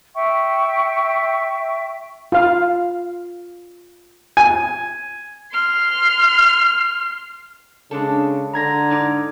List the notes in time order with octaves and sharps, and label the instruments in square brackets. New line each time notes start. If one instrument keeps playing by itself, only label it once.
[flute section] E5 G5 C#6
[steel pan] F4 F5
[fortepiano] G#5
[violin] C6 F6
[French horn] C#3 [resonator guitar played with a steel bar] G#3 D4 A4
[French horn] D3 [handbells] A#5 G#6 A#6
[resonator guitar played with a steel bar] G#2 D#4 D5